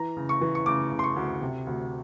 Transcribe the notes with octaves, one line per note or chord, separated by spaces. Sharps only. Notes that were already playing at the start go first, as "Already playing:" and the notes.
Already playing: E3 A#5
C#3
C#6
E3
C#6
C#3 D6
C#3
C6
C#6
D2
C3
D2